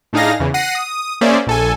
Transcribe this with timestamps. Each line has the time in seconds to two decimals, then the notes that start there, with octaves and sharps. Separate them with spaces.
0.13 A2 D4 D#4 G#4 F5 A#6
0.40 E2 C#3 E3
0.54 F#5 A#6 C7 D#7
0.75 D#6
1.21 A#3 C#4 G#4 C5 D5 E5
1.47 A#1 A4 G#5